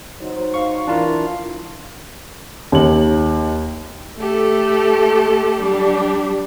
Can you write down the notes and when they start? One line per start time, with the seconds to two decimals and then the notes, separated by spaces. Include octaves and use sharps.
0.21 F#3 D#4 C5
0.54 F5 C#6
0.87 E3 D4 F4 A#4
2.72 D#2 F#7
4.18 A3 G4 A4
5.60 F#3 G3 D4 G4